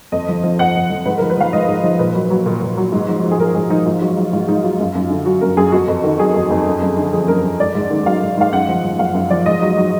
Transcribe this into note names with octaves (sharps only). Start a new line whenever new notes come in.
F2 D#5
F3
F3
F2 F#5
F2
F3
G#2 B4
F3 A#4
B4
F3 F5
G#2 D#5
G#2
F3
A#2 B4
F#3
F#3
A#2
A#2
F#3
G#2
F3
F3
G#4
G#2 A#4
G#2 G#4
F3 D#4
G#2 F4
F#3 F#4
F#3 F4
G#2 F4
G#2 D#4
F#3 F4
F#2
F#2
D3
F#3 F#4
F#2 A#4
F#2 G#4
F2 F#4
F2
D#3
F#3 G#4
F2
F2
F#2
F#2
D3
F3 G#4
F#2 A#4
F#2
G#2 D5
G#2
D#3
F#3 F5
G#2
G#2 F5
F#2 F#5
F3
F3
F#2 F5
F#2
F3 D5
G#2 D#5
F#3
F#3